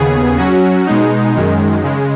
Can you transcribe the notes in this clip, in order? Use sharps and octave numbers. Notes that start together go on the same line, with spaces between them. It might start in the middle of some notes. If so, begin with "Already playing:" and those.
Already playing: D#2 C#3 B3 G#4
F#3 C#4 F#4
B2 G#3 D#4
F#2 D#3 G#3
C#3 G#3